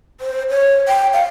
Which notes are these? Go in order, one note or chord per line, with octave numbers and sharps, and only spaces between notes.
C5
C#5
G5
F5